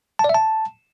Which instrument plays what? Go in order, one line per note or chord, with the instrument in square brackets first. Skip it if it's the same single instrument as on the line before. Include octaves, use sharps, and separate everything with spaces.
[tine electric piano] A5
D5
E5
A5